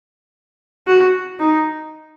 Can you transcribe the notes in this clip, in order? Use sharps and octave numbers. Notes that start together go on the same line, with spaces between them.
F#4
D#4